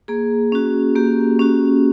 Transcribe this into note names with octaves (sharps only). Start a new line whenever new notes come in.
A#3 G#4
C#4 F#4
A#3 G4
C#4 F#4